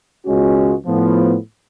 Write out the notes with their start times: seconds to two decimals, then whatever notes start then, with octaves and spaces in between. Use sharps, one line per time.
0.25 C#2 B2 G#3 C#4 F#4
0.86 A2 F3 B3